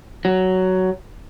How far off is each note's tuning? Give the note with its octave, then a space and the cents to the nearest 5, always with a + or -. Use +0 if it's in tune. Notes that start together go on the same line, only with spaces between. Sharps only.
F#3 +10